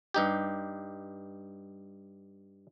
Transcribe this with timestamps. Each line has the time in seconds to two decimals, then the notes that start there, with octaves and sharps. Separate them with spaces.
0.14 G2 D#4 G4